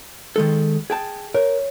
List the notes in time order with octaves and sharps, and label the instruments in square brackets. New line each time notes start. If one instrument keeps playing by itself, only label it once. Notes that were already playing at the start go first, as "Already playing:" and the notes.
[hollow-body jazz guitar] D#3 G#3 A4
G#4 G5 A5
[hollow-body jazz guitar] A#4 [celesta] C#5